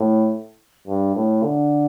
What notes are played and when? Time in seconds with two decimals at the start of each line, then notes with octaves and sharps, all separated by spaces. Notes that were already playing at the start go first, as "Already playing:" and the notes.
Already playing: A2
0.87 G2
1.16 A2
1.44 D3